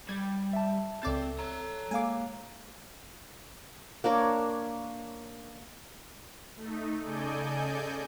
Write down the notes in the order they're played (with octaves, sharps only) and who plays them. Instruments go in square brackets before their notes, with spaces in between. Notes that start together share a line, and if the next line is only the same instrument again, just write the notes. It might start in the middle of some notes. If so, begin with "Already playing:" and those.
[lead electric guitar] G3 [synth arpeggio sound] G#6
[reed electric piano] E5 A5
[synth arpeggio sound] C#2 D5 A6 [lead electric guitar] C4 [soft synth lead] A4
[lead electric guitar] C#5 A#5
[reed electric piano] G#3 A#3 F5 [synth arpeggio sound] G#5 D6
[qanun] A#3 D4 A#4 C#5
[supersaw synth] A3 D#4
C#3 A4 D5 D#5 G#5 G6